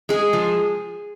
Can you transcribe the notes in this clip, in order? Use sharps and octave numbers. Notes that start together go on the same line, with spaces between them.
G#3 G#4
F3